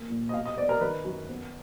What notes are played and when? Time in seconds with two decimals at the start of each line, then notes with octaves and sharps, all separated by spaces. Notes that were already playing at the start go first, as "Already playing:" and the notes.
Already playing: A#3
0.10 A#2
0.29 D#5
0.34 B2 F5
0.45 D#5
0.57 B3 D5
0.69 A#4
0.81 D#3 B4
1.05 F#2
1.29 B3